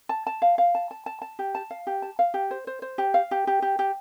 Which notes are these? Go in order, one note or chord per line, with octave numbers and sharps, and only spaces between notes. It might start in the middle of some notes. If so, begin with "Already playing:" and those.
A5
A5
F5
F5
A5
A5
A5
A5
G4
A5
F5
G4
A5
F5
G4
C5
C5
C5
G4
F5
G4
G4
G4
G4